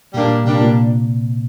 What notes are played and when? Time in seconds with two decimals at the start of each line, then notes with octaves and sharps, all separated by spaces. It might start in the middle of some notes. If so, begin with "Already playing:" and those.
0.14 A#2 G3 A#3 D4
0.24 A#2
0.45 C3 G3 A#3 D4
0.61 A#2